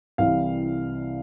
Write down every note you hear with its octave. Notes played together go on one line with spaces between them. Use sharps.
C2 C3 E3 G3 F5